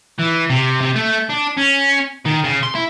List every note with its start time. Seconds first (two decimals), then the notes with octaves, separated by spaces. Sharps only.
0.19 E3
0.50 C3
0.81 C3
0.96 A3
1.30 D4
1.58 C#4
2.25 D#3
2.44 C#3
2.63 C6
2.75 E4